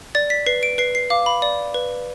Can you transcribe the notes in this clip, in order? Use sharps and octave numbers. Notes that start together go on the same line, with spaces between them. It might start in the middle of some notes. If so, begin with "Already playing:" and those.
D5 A6
B6
B4 C7
D7
B4 C7
C7
F5 D6
B5
D5
B4